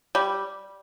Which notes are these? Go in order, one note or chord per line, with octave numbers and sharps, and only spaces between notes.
G3